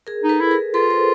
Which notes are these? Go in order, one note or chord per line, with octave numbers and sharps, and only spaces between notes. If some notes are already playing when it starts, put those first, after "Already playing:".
G#4 A#4
D#4
A4 B4
E4
G#4 A#4
F4 A4 B4
A#4 C5